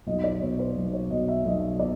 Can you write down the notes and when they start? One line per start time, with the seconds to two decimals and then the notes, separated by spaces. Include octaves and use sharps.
0.07 B1 D#5
0.24 D5
0.42 B2 C#5
0.59 C5
0.77 B1
0.93 C#5
1.11 B2 D#5
1.28 E5
1.45 B1 D#5
1.79 B2 D5